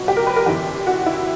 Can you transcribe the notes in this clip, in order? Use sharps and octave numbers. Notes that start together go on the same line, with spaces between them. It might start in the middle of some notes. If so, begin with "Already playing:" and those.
Already playing: C#2 B2 F#3
G4
A#4
B4
A#4
G1 F#2 E3 G4
F#4
E4